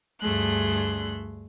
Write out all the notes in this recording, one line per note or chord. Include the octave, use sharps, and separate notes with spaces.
D2 G2 A3 G#4 C6 F#6